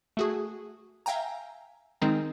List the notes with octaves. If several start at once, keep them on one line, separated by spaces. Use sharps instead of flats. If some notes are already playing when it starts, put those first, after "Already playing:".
A3 F#4 G#4
E5 F5 G5 G#5 A#5
D#3 G#3 C4 D#4